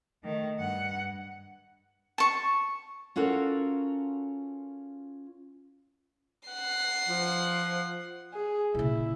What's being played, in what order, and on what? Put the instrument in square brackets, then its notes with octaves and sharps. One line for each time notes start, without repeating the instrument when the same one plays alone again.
[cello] D#3 A3
G2 F#5
[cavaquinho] A5 C#6
[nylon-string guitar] C#4 F4 F#4 A4 A#4
[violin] F#5 C7
[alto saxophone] F3
[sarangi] G#4
[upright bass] A#2 C#3 [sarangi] E4